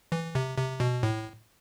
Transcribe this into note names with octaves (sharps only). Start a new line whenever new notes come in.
E3
C3
C3
B2
A2